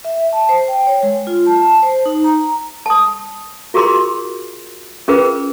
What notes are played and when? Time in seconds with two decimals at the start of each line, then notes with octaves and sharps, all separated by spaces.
0.05 E5
0.33 A5
0.49 C5
0.68 G5
0.87 C#5
1.03 G#3
1.27 F4
1.46 A5
1.67 A5
1.82 C5
2.05 D#4
2.24 A#5
2.86 A5 D#6
3.74 F4 F#4 G#4 A#4 B5 C6
5.08 C#4 F4 G#4 A#4 B4